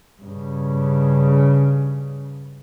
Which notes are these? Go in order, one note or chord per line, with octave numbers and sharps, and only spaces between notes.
G2 C#3